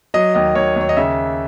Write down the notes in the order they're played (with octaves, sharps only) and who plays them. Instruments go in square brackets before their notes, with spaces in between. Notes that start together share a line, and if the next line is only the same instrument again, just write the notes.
[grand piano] F#3 D#5
D#2 D#5
D#2 C#5
D#2
C#5
D#5
C#3 E5